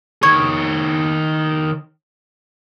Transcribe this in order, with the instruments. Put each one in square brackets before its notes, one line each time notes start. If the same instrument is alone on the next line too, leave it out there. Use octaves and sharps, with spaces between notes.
[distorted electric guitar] D#3 C#5 [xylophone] C#6 G#6